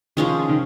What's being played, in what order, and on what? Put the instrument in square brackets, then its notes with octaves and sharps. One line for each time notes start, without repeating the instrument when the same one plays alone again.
[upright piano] D#3 [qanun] F3 G#3 C#4 G#4
[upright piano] D#3